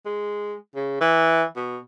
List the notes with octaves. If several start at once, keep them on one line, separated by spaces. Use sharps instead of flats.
G#3
C#3
E3
B2